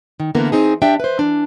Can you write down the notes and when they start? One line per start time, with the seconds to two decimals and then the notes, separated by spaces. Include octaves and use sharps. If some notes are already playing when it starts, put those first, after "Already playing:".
0.20 D#3
0.35 D3 E3 A#3 B3 A#4
0.52 C4 D#4 G#4
0.82 D4 G4 D5 E5 G5
1.00 B4 C5
1.19 E3 D4